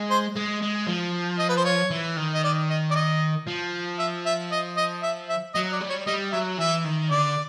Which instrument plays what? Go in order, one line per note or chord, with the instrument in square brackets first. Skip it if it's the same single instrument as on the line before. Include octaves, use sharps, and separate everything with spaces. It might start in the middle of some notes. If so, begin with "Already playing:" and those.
Already playing: [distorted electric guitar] G#3
[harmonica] C5
[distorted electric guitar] G#3
G#3
F3
[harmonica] D#5
B4
C5
C#5
[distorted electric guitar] E3
D#3
[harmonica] D#5
D5
D#5
D5
D#5
[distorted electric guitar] F3
[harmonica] E5
E5
D#5
D#5
E5
E5
[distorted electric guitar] F#3 [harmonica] D#5
[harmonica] D5
[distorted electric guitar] G3
[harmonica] C#5
[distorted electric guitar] G3 [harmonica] D#5
[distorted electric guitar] F#3 [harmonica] E5
[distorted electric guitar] E3 [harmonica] E5
[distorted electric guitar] D#3
[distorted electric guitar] D3 [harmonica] D5